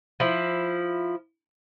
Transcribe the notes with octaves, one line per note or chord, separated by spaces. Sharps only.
F3 E4